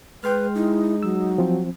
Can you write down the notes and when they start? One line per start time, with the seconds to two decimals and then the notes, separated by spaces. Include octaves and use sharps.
0.24 G#3 B4 G5 C6 F6
0.55 D#4 E4
1.03 F#3 E6
1.38 F3 C4